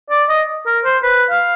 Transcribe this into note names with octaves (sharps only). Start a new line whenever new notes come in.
D5
D#5
A#4
C5
B4
F5